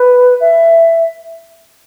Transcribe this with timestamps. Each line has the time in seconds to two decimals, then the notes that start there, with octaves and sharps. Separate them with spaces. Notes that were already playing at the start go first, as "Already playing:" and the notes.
Already playing: B4
0.41 E5